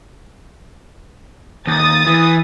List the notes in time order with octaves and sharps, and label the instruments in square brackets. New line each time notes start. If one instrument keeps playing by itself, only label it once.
[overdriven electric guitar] D#2 [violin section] D#6 A6
[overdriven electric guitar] E3